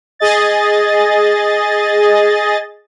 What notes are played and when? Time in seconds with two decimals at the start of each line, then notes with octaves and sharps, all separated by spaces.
0.19 G#4 D#5 A6